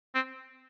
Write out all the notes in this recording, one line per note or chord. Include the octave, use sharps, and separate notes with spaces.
C4